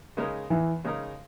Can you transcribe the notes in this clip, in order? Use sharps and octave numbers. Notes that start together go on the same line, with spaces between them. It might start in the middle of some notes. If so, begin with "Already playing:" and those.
C#3 G#3 D#4 A#4
E2 E3
C#3 G#3 D#4 A#4